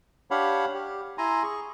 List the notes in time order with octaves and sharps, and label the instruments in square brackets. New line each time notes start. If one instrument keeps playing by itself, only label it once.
[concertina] D4 G4 C#5 F5 F#5 B5
G4
E4 G#5 A#5 C6
G#4 C#6